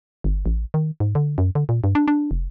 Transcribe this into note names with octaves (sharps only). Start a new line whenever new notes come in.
G1
A1
D#3
G#2
D3
F#2
D3
A#2
G2
D4
D4
F1